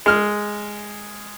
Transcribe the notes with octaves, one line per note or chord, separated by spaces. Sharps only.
G#3 F6